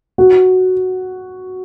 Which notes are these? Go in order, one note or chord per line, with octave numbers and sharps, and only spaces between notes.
F#4